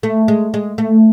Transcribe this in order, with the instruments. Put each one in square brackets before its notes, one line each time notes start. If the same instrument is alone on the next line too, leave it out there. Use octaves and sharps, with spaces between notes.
[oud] A3
G#3
G#3
A3